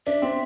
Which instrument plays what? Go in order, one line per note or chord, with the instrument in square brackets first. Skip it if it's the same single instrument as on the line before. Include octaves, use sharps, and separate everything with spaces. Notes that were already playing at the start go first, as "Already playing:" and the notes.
[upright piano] D4 [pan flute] E5
[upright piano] C4